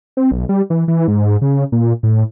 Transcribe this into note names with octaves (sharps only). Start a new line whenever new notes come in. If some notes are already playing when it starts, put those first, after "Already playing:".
C4
B1
G3
E3
E3
G#2
C#3
A#2
A2